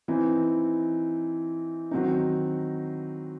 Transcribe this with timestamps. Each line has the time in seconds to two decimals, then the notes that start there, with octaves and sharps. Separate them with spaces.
0.08 E3 C4 D#4
1.91 D#3 F#3 C4 D#4